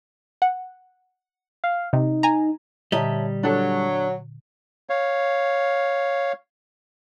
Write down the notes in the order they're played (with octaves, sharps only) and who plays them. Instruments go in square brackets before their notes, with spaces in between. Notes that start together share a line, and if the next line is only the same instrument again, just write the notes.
[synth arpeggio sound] F#5
[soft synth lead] F5
[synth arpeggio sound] C3 [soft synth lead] D#4
[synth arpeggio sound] G#5 A#5
[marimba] A#2 D3 A#5 [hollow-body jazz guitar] G3 D#5 [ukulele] C#5 E5 A5
[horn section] F#3 [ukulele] D4 A4
[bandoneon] C#5 F5